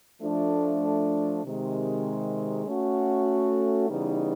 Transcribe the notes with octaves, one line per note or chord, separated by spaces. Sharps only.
F3 A3 D4
C3 D#3 G#3
A3 C#4 F#4
C#3 E3 G3 B3 D#4